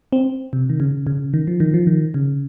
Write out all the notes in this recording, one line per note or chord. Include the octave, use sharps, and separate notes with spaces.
C4
C3
D#3
C#3
C#3
D#3
F3
D#3
F3
D#3
C#3